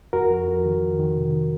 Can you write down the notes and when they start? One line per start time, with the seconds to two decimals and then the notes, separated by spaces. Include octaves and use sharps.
0.13 F2 F#4 A#4
0.30 F2
0.48 F2
0.66 D#3
0.83 F2
0.99 D#3
1.17 C3
1.33 D#3